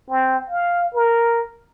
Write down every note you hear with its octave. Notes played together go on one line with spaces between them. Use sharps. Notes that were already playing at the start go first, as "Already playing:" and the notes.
C4
F5
A#4